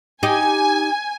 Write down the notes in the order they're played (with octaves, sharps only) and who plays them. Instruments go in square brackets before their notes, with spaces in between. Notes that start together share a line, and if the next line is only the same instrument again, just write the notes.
[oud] D#4 G4 [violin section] G#5